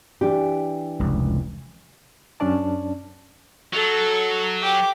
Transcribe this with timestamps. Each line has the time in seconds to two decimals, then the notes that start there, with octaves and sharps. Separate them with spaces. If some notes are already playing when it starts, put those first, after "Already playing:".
0.21 E3 D4 G4
0.99 F1 C#2
2.40 F#2 C#4 D4 D5 A5
3.73 F#3 A4
4.62 G4 D6